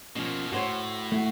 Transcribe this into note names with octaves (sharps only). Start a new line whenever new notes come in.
B2 F3 A#3 C#4
A2 F#4 C5 C#5
A3 E4 F#4